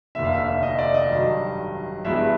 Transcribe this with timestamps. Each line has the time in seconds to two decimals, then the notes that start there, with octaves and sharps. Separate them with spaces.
0.15 F1 D#2 D3 E5
0.24 F5
0.33 E5
0.63 D#5
0.78 D5
0.94 D#5
1.10 G2 D#3 F#3
2.05 G2 E3 G#3 B3 E4 E5